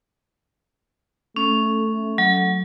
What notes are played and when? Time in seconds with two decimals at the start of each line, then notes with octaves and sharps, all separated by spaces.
1.36 A3 C#4
2.18 F#3